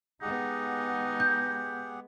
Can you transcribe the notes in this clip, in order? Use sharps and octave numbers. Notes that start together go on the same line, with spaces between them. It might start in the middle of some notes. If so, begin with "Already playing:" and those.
G#3 B3 D#4 G4 G#4 F#5
G6